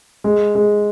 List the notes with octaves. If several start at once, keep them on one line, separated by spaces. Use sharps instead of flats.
G#3
G#3